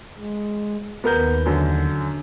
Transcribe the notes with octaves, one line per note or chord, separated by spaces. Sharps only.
G#3
D#2 B3 A#4 G6
F#2 D3